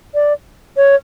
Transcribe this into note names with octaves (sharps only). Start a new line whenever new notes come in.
D5
C#5